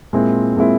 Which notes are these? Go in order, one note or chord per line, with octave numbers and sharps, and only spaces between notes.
A#2 G#3 C4 E4
A#2 G#3 C4 E4